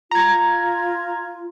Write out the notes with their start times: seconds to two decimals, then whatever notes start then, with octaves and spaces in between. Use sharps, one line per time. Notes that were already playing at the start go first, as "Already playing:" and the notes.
0.11 F4 A#5 G#6